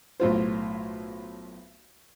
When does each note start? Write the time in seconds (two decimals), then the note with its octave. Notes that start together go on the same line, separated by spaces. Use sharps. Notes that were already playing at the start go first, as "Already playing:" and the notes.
0.20 B1 A2 F4 C5